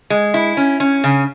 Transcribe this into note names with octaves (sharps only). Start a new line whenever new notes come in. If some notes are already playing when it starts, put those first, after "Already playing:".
G#3
E4
C#4
C#4
C#3